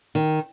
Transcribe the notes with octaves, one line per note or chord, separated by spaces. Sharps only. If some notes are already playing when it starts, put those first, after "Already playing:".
D#3